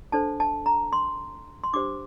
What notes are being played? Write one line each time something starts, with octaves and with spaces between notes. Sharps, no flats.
D4 A4 C5 A5
A5
A#5
C6
C6
D4 G4 C5 D6